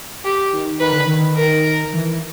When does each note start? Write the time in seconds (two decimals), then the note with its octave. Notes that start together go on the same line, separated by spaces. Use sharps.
0.25 G4
0.52 D#3
0.80 D#3 B4
0.92 D3
1.06 D#3
1.37 A#4
1.93 E3